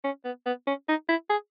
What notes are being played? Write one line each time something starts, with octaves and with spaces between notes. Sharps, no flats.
C#4
B3
B3
C#4
D#4
E4
G#4